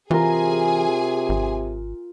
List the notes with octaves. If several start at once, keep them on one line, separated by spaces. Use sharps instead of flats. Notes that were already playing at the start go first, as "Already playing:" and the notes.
C3 E3 F4 G#4 A#4 G#5
G#1